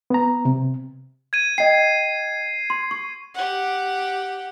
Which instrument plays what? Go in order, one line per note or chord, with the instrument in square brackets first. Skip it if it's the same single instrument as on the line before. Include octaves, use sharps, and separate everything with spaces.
[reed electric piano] B3 A#5
C3
[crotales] G#6 D#7
[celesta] D#5 G5 [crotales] C7
[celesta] C6
C#6
[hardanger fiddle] G4 F#5